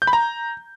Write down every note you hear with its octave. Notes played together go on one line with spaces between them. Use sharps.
G6
B5
A#5